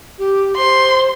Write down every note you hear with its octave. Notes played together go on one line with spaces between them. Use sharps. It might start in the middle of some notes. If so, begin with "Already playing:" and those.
G4
C5 C6